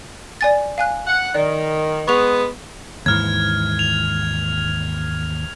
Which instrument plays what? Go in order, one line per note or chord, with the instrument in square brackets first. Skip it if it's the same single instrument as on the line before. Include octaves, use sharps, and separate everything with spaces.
[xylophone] D5 G#5 A6
F5 G#5 F#6
[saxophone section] F#5
[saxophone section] D#3 [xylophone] D5
[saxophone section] G#3 B3 [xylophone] C#6 F7
[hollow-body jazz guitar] D#2 G#2 E3 [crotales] F6 G#6
[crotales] F7